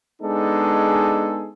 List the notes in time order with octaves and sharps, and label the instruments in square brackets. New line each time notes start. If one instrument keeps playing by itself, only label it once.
[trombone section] G#3 B3 D4 D#4 G#4 A4